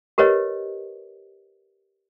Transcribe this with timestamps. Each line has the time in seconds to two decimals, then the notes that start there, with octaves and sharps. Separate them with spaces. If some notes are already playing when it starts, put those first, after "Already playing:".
0.18 G4 A#4 B4 C#5 D#5